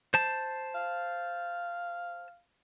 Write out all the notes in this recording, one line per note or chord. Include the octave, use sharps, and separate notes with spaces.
C5 A5
F5